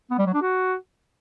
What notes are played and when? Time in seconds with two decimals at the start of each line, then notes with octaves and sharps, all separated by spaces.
0.10 B3
0.18 G3
0.26 F#3
0.34 D4
0.41 F#4